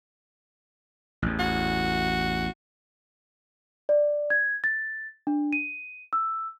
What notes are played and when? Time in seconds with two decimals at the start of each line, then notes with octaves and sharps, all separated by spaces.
1.22 A1 E2
1.40 F#4
3.89 D5
4.30 G#6
4.64 A6
5.27 D4
5.53 D#7
6.13 E6